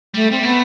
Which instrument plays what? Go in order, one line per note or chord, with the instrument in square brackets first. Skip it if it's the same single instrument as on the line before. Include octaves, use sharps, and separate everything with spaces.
[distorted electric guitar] G3 [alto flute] A3
[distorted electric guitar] G3 [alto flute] C4
[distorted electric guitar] A3 [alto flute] B3